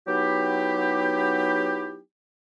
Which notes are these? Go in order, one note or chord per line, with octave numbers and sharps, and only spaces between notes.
F#3 B3 D#4 E4 G4